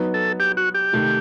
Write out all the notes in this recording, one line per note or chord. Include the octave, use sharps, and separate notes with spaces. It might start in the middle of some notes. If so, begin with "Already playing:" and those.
Already playing: F#3 B3 D#4
A4
G4
F#4
G4
C3 D#3 A3